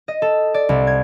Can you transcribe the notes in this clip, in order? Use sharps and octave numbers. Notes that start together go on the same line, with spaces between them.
D#5
A4
D5
C2
G#6